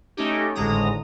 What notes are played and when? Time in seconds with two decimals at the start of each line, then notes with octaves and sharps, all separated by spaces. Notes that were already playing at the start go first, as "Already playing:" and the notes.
0.17 A3 C#4 D#4 G4
0.55 G#1 A2 D3 G#3 A#5 D#6